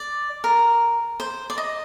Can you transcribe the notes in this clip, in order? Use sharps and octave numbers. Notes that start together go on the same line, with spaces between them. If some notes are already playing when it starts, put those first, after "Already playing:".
Already playing: D5
A#4
C5
D5
D#5